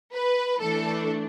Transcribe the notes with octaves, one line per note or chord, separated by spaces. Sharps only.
B4
E3 A3 D4 A4